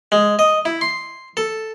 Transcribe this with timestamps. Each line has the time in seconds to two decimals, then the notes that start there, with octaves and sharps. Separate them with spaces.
0.12 G#3
0.39 D#5
0.65 E4
0.81 C6
1.37 A4